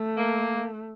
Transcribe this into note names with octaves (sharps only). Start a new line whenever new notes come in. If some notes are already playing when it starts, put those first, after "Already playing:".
Already playing: A3
A#3